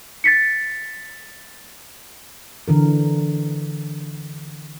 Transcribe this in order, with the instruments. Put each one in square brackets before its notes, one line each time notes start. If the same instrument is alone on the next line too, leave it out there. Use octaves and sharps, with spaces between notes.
[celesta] A6 B6 C#7
[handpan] D3 E3 A#4